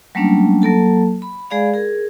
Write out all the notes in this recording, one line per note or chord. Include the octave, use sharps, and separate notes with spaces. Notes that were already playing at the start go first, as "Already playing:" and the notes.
F#3 G3 A3 A#3 C#4 D4
F#3 A#3 A4 A5
B5
G#3 G#4 D5 F5 B5
G#4 A#4